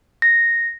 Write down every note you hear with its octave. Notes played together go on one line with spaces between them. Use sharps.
A#6